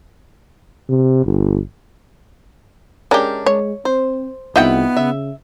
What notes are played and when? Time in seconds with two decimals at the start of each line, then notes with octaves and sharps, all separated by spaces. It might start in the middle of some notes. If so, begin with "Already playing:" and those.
0.89 C3
1.25 G1
3.11 G#3 C#4 D4 G4 A#4
3.46 G#3 C#5
3.85 C4 C5
4.56 C2 B3 D#4 F4 E5 F#5 G5
4.97 C#3 E5